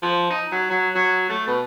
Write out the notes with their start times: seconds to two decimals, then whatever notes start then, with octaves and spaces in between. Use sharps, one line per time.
0.02 F3
0.30 D#4
0.52 F#3
0.70 F#3
0.95 F#3
1.29 A3
1.47 B2